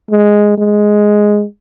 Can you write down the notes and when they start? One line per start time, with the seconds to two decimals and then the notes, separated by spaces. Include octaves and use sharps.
0.11 G#3
0.58 G#3